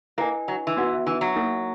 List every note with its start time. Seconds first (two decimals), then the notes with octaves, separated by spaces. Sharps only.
0.18 A#3 E4 B4 D#5 G#5
0.48 F#3
0.67 E3
0.77 B3 D#4 F#4 B4 F#5
1.07 E3
1.21 F#3
1.36 A#3 D#4 A#4